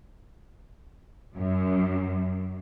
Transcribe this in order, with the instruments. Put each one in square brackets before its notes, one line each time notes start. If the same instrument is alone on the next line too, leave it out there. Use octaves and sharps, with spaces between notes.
[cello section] F#2